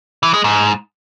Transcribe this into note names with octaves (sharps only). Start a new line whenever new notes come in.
E3
G#3
G#2